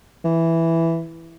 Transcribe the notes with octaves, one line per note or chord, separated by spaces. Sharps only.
E3